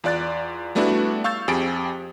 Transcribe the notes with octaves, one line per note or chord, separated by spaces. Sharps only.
E2 F4 D5 F#6 A6
G3 A3 B3 D4 E4 F#4
F5 C#6 E6 G6 A6
F2 G4 G#4 G#5 A6 D7